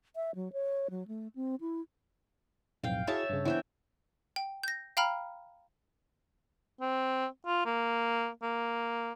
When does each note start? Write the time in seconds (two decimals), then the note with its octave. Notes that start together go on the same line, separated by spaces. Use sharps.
0.16 E5
0.35 F#3
0.53 C#5
0.90 F#3
1.08 A3
1.35 C4
1.61 E4
2.84 B1 F2 A2 F5 G5
3.07 E4 F#4 G#4 C#5 E5 A5
3.29 G2 C#3
3.45 E3 B3 D4 C5 E5 G5
4.36 G5
4.63 G6 A#6
4.97 F5 G5 A#5 B5 F6
6.81 C4
7.46 F4
7.66 A#3
8.42 A#3